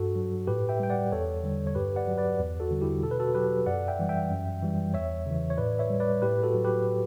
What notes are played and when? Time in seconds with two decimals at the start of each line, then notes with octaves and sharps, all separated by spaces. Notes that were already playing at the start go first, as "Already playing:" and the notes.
Already playing: G2 F#4 A4
0.16 F#3
0.47 A2 G4 B4
0.69 E5 G5
0.80 G3 G5
0.90 D5 F#5
1.12 E2 A4 C#5
1.44 D3 G3
1.67 C#5
1.75 G2 G4 B4
1.96 D5 F#5
2.07 F#3
2.17 B4 D5
2.39 E2
2.60 F#4 A4
2.71 D3 G3
2.82 E4 G4
3.03 B2 A4
3.11 B4
3.20 F#4 A4
3.35 F#3 G4 B4
3.66 F#2 D5 F#5
3.88 E5 G5
3.99 E3 G3
4.09 E5 G5
4.31 F#2
4.62 E3 G3
4.94 E2 C#5 E5
5.26 C#3 E3
5.50 C#5
5.58 A2 B4 D5
5.79 C#5 E5
5.90 G3
6.00 B4 D5
6.22 A2 G4 B4
6.43 F#4 A4
6.54 F#3
6.64 G4 B4